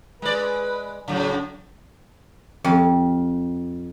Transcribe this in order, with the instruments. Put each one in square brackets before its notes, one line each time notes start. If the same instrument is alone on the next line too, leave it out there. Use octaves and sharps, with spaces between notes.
[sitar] G#3 D5 [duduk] B4
[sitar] A2 C#3 [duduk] F#3
[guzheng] F2